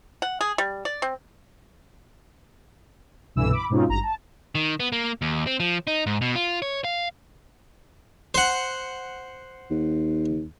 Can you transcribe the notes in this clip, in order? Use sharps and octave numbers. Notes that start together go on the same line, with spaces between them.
F#5
G#4
G3
D5
C4
C2 G2 B2 D3 E3 E6
B5 D6
G#2 B2 C4 C#4 D#4 F4
G#1 G2 A#5
A5
D#3
B3
A#3
D#2
C4
F3
D#4
G#2
B2
F4
C#5
F5
C5 F#5
D#2